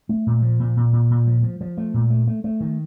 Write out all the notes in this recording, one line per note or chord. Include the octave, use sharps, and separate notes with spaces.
A3
A#2
F3
A#2
A#2
A#2
A#2
F3
F3
F3
A3
A#2
A3
A3
A3
D#3